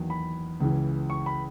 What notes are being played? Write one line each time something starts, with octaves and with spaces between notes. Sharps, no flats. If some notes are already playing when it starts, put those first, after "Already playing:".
Already playing: E2 D#3 F#3 A#3
B5
C#2 C#3 E3
C#6
B5